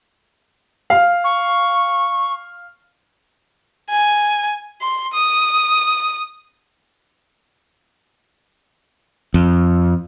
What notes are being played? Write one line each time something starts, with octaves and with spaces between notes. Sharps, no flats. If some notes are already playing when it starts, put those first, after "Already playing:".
F5
C#6
G#5
C6
D#6
F2